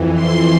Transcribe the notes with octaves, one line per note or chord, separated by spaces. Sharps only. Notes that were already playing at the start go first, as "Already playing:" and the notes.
Already playing: F2 E3
C6